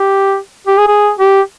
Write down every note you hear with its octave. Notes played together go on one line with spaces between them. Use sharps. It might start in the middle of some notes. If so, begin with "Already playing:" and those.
Already playing: G4
G4
G#4
G#4
G4